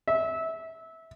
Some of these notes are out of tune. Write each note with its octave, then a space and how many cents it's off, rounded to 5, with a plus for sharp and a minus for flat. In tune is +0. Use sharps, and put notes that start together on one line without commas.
E5 -20